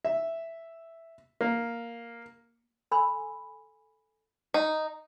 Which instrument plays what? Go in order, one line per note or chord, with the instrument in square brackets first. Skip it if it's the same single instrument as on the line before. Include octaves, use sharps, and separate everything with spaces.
[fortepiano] E5
A#3
[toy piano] A4 G#5 B5 C6 E6
[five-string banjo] D#4